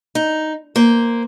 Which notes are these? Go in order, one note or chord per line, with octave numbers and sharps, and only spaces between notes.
D#4
A#3 C5